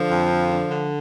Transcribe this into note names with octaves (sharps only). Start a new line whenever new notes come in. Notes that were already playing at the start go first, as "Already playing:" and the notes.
Already playing: D3 F3
F2
D3
D3
D3